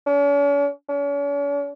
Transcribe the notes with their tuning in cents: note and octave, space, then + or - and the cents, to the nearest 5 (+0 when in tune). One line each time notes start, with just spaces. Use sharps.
C#4 +45
C#4 +45